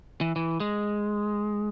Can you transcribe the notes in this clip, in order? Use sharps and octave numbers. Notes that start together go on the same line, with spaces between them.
E3
E3
G#3